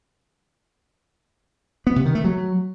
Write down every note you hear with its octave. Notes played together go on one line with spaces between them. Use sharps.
B3
C3
D#3
A3
F#3